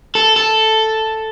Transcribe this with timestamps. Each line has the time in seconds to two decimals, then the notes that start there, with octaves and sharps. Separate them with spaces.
0.15 A4
0.36 A4